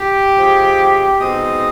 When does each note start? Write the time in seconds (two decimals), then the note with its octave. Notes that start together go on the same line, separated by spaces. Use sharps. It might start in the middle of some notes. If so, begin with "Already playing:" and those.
Already playing: G4
0.38 F3 G#3 C4
1.19 B2 G#3 C4 D#4 D#5